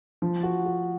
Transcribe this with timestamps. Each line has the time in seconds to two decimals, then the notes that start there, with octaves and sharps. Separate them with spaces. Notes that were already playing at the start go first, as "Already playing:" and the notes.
0.22 F3
0.43 F#4
0.65 F#4